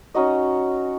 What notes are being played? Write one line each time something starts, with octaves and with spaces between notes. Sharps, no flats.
C#4 D#4 F#4 D#5